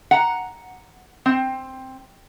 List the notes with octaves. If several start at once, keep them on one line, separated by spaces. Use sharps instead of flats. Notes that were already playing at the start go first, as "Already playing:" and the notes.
F#5 A#5
C4